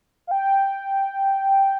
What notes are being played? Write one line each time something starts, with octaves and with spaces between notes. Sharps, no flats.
F5
G5